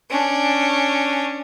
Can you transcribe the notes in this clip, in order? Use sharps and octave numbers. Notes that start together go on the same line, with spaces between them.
C#4 D4